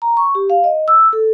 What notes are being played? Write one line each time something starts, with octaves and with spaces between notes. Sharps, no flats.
A#5
C#6
G4
F5
D#5
E6
A4